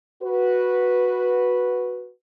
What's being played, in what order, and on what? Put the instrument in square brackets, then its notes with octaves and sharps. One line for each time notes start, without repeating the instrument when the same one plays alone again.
[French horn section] F#4 B4